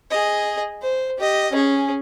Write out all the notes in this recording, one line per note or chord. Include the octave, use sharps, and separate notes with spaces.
G#4 D#5
C5
G4 D#5
C#4 G#4